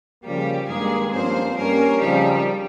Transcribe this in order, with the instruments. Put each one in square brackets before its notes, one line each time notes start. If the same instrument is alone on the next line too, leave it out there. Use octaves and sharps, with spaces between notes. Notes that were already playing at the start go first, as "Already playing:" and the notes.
[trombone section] C#3 F3 A#3 [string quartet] G3 G4
[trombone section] G2 D#3 A#3 [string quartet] G#3 G#4
[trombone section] G2 F3 A#3 C#4 [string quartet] C4 C5
[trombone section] G2 G3 C#4 [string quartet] A#3 A#4
[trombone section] C#3 F3 C4 D#4 [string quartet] G3 G4